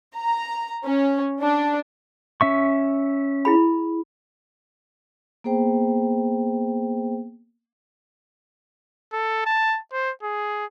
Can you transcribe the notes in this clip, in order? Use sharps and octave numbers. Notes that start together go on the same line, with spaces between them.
A#5
C#4
D4
C#4 E5 C#6
E4 G#4 B5
A#3 B3 G#4 C5 G5
A4
A5
C5
G#4